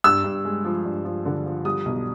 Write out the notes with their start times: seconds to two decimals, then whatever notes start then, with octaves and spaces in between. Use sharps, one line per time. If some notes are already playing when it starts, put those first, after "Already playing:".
0.04 G2 E6
0.24 G2
0.45 G#3
0.64 F3
0.85 G2
1.05 F3
1.25 D3
1.45 F3
1.65 G3 D#6
1.85 B1